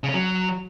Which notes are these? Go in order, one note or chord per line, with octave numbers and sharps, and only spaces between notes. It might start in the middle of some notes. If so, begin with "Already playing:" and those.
C#3
C#4
F#3